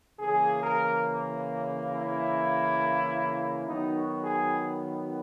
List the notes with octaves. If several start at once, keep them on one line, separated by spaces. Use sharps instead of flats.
C#3 E3 A#3 G#4
A#4
E4
D#3 F#3 B3 D#4
F#4
G#4